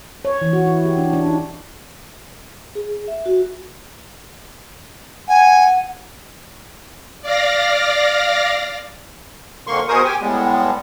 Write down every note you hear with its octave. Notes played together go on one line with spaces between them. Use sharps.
C#5
E3
F#4
E4
G4
D4
D4
D#4
G#4
E5
F#4
F#5 G#5
D5 F5 A#6
F2 D3 A#3 C6 C#6
B2 G#4 A#4 C5 C#6 D#6
G4 G5 G#5
A2 G3 G#3 B3